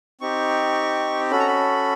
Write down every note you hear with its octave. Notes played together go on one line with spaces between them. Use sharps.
C4 D#4 G4 C#6
C#4 F#4 A4 B5
A#5
B5